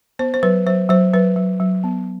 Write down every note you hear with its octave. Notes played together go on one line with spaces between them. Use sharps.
B3 C5
C5
F#3 B4
F#3 C5
F#3 C5
F#3 B4
F#3
F#3
B3